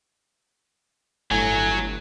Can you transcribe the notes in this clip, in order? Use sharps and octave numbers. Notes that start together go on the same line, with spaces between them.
G1 A2 F#3 G#5